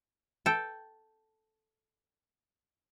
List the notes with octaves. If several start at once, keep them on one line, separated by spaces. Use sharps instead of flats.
A4 G5